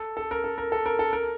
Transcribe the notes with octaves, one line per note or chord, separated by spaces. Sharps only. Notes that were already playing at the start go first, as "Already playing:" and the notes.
Already playing: A4
A4
A#4
A4
A#4
A4
A#4
A4
A#4